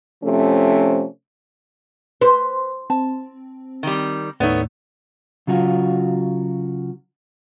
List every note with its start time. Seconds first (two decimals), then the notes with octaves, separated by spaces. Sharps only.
0.23 C3 F3 A3 C#4
2.21 B4 C5
2.90 C4 A5
3.83 D#3 G3
4.40 D#2 A2 A3 B3 D#4 C#5 D5
5.47 C#3 F#3 F4 F#4